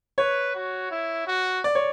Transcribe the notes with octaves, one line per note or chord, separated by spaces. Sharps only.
B4 C#5
F#4
E4
F#4
D5
C#5